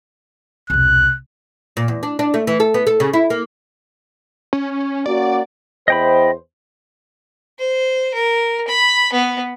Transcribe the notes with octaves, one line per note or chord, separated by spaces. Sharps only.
E1 C2 F#6
A#2
E2
D4
D4
A3
E3
A4
B3
A4
C#3
E4
A#3
C#4
A#3 C#4 F#4 D5
E2 C5 D#5 G5 B5
C5
A#4
B5
B3